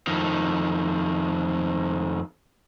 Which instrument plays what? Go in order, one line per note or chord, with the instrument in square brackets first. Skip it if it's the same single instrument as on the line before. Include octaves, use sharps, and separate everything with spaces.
[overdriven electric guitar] F2 D#3